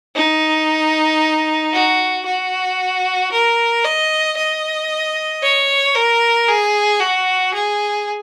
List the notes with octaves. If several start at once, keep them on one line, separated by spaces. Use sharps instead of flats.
D#4
F#4
F#4
A#4
D#5
D#5
C#5
A#4
G#4
F#4
G#4